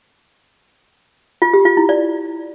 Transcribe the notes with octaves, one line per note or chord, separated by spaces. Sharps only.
F4
G4
F4
E4
D5